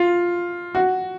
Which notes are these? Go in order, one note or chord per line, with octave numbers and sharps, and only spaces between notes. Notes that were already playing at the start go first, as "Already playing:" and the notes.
Already playing: F4
F#4